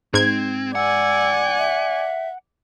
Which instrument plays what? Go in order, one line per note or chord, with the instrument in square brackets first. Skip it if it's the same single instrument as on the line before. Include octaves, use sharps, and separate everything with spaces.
[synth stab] G#2 G#6 [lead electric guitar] C4
[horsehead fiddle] D5 G#5 [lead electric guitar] F#5 [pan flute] E6
[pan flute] E5